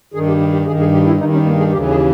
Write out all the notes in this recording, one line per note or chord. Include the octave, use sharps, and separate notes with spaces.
G2 D#3 G#4
G4
G4
G4
G2 D#3 G#4
G#4
G4
E4
G2 D#3 D#4
C#4
A#3
G#4
D#2 C#3 E3 G4
G#4